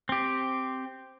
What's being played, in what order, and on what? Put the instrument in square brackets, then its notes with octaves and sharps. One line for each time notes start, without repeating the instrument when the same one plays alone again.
[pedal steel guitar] C4 G4